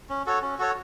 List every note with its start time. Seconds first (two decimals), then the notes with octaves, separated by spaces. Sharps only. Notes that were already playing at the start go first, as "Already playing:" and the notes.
0.09 C#4
0.26 F#4 A4 C#5
0.42 C#4
0.58 F#4 A4 C#5